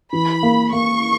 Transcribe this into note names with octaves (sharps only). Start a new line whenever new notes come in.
E3 B5
A#3
A#3 C#6